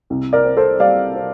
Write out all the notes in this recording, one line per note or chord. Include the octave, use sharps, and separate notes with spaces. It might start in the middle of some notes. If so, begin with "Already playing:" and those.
C2
A#4 D5
C4
A4 C5
G3 D5 F5
C4